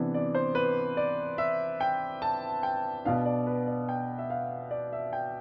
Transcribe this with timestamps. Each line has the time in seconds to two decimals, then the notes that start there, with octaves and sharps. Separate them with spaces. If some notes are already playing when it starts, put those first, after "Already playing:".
Already playing: C3 E3 B3 D4
0.14 D5
0.35 C5
0.55 B4
0.97 D5
1.38 E5
1.80 G5
2.22 A5
2.63 G5
3.04 B2 B3 D4 F5
3.25 D5
3.47 B4
3.67 D5
3.89 G5
4.19 E5
4.30 F5
4.71 D5
4.93 E5
5.13 G5